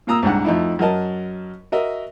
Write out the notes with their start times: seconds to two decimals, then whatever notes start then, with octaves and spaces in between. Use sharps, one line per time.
0.07 A#2 A#3 A#5 D#6 E6
0.23 C2 G#2 D4 F#5
0.44 F2 A3 D#4 E4
0.79 F#2 F#3 A#4 D#5 A5
1.72 F#4 A#4 D#5 E5